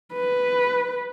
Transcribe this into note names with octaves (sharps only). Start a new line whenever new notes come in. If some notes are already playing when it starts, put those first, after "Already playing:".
B4